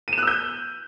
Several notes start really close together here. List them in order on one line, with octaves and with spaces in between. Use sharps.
D#7 E7 F#6 E6 G6